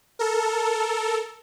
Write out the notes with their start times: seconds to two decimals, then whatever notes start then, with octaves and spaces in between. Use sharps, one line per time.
0.19 A4 A#4